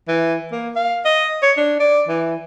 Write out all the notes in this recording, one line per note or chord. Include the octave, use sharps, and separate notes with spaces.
E3
A#3
F5
D#5
C#5
D4
D5
E3